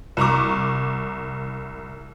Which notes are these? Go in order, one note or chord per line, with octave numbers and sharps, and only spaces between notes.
C2 A#5 C#6 D6